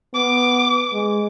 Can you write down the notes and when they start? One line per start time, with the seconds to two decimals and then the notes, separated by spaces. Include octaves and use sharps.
0.14 B3 D6
0.93 G#3